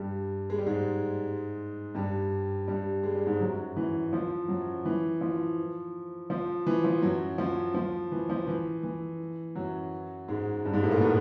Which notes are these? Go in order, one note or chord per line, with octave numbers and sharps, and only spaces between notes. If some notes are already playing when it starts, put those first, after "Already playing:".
Already playing: G2 G3
G#3
G3
G#2 G#3
G2 G3
G2 G3
G#3
G3
G#2 G#3
F#2 F#3
E3
F3
F#2 F#3
E3
F3
F3
E3
F3
F#2 F#3
F3
F3
E3
F3
E3
E3
F#2 F#3
G#2 G#3
G2 G3
G#2 G#3
A2 A3
A#2 A#3
B2 B3